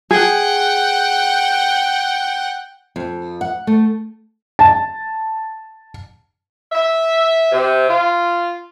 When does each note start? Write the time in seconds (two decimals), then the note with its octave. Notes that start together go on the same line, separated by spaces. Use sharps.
0.11 G#4 F#5 G5
2.96 F2
3.41 F#5
3.67 A3
4.59 A5
6.72 E5
7.52 C3
7.90 F4